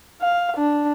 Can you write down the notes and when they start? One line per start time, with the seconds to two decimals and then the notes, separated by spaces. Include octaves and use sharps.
0.22 F5
0.57 D4